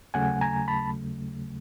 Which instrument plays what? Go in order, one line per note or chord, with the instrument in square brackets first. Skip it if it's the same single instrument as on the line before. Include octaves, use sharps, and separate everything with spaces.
[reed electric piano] D#2 C#3 F#3 A3 F#5 G#5
G#5 A#5
A5 B5